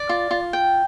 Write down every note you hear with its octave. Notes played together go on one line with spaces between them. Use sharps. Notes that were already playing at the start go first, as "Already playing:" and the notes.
Already playing: D5
F4
F4
G5